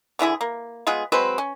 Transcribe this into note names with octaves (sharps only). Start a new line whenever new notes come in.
D3 E3 E4 G#4
A#3
G#3 B3 F4 G#4
F#3 G#3 C4 B4
C#4